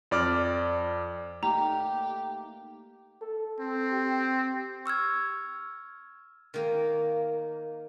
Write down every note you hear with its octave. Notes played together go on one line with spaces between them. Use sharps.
F2 D5 D6 F6
A3 A#3 D#4 G4 A#5
A4
C4
G4
C#6 E6 F6 G#6
D#3 A#3